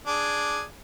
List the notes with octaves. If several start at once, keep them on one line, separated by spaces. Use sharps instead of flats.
D4 G#4